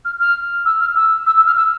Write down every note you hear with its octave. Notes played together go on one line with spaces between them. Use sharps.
F6
F6
E6
F6
E6
E6
E6
F6
E6